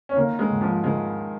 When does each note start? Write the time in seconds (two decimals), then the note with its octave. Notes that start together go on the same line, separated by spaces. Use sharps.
0.09 C#4
0.16 D#3 A#3
0.39 G#3
0.50 G#2
0.61 F3
0.84 D#3 G#3